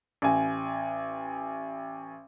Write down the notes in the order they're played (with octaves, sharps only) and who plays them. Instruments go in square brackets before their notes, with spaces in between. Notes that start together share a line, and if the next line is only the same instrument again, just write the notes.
[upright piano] A1 G#5